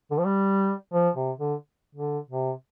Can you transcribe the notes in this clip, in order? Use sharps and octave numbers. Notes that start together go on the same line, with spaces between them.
D3
F3
G3
F3
C3
D3
D3
C3